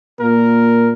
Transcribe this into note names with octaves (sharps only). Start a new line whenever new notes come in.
A#2 A#3 A#4